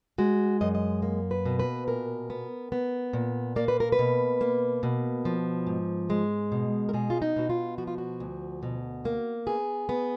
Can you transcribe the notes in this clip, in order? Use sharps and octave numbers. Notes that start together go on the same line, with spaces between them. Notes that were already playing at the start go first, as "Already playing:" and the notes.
G#3 F#4
F#2 D#5
D#5
A#3
B4
B2
B4
A#2 A#4
B3
B3
A#2
A#3 D5
B4
A#4
B4
B2
A#3
B2
F3
G#2
G#3
B2
A#4
B2 G#4
F4
D#4
B2 F#4
F4
F3 F#4
F4
F#4
D2
B2
A#3
B3 G#4
B3